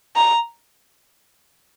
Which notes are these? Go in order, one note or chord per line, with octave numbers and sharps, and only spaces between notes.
A#5